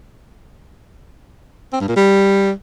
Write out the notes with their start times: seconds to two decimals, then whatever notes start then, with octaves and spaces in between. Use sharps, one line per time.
1.73 C4
1.81 G2
1.88 A#2
1.96 G3